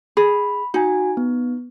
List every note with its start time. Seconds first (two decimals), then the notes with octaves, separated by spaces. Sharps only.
0.17 G#4 B5
0.74 D#4 F#4 G#5
1.17 B3